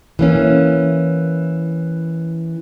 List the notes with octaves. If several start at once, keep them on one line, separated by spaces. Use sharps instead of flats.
E3 A#3 C#4